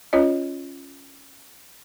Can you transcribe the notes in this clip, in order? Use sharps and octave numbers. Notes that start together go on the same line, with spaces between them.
C#4 F4 C#5 D#5